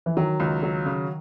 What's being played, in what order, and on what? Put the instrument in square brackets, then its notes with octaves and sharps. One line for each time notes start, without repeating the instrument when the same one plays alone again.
[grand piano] E3
[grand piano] D#3 [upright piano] F#3
[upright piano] C#2
F#3
C#3